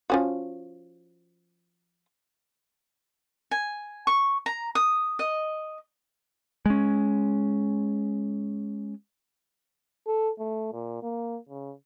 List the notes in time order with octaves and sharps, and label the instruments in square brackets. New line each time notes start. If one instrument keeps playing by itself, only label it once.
[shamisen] F3 C#4 F#4
[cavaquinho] G#5
C#6
A#5
D#6
D#5
[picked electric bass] G#3 C#4
[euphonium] A4
A3
A#2
A#3
C#3